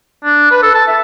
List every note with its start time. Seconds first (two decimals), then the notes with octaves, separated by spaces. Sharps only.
0.24 D4
0.51 B4
0.63 A4
0.75 A5
0.87 E5